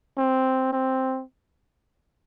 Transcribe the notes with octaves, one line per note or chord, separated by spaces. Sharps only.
C4
C4